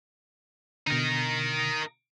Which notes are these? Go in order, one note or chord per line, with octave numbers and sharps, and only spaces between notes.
B2 D3 D#4 A#4